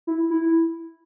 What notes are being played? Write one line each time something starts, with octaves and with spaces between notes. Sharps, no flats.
E4
E4